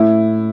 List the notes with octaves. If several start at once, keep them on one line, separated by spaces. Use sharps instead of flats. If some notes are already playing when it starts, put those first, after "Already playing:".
Already playing: A2 E4